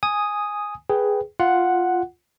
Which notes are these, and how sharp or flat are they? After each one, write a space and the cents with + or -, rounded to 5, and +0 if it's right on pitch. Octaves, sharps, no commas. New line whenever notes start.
G#5 -5 D#6 +0
G#4 +0 B4 +0 G5 -10
F4 +0 F#5 +0